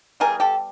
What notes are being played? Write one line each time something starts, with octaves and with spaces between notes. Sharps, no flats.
E3 G3 B3 G#4 A#4
G4 A4